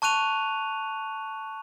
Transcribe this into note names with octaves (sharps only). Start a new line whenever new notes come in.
A5 C#6 F#6 D#7 F7